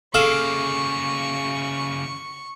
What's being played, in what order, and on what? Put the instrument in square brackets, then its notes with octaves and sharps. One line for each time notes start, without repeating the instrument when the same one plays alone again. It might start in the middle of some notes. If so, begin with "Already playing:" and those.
[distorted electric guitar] C#3 A#3 [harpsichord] G#4 F5 [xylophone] A4 E7 [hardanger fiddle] C#6